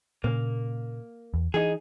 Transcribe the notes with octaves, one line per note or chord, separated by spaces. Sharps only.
A#2 C#3 A#3
E2
E3 D#4 G#4